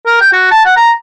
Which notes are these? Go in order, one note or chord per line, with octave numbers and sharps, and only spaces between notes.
A#4
G5
F#4
A5
F#5
A#5